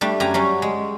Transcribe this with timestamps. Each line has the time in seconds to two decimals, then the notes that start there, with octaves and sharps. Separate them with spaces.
0.01 G3 A3 D4
0.20 F#2 G4 G#5 A#5
0.34 F#3 G3 C#4
0.62 G#3